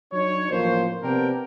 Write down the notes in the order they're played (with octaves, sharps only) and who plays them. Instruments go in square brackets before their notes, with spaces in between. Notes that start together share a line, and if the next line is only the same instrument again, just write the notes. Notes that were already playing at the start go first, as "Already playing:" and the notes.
[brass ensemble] F#3 D4 D#4 C#5
A1 F3 A#3 C5
C3 B3 C4 D4 A#4 G5